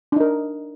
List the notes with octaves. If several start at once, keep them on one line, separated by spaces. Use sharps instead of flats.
D4 D#4 A#4